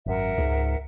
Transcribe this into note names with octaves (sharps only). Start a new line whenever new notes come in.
G#1 F#2 A#4 E5 F#5
C#2 G#2